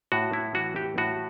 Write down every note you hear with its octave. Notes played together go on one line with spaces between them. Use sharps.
A2 F#4
E4
E3 F#4
G4
A2 F#4